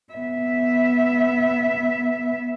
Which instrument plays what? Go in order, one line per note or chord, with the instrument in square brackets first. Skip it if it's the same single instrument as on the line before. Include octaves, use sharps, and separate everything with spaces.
[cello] B3 E5